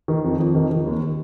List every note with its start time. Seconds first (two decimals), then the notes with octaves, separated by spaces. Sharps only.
0.08 D#3
0.24 F2
0.40 F2
0.55 D#3
0.71 D#3
0.86 D#2